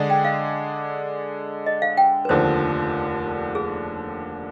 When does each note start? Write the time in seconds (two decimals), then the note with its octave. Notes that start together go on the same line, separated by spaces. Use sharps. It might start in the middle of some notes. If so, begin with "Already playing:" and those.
Already playing: D3 G#3 D4 G#4 D5
0.10 G5
0.25 F5
1.66 D#5
1.82 F5
1.97 G5
2.25 B4
2.29 F1 D#2 D3 F3 C5
3.55 G#4